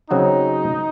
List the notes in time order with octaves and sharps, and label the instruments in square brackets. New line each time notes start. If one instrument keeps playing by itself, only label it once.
[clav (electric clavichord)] C#3 F#3 C4 F#4 [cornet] D#4